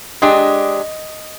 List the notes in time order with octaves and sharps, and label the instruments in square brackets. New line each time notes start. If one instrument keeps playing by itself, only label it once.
[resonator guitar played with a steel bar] G#3 D4 G4 [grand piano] D#5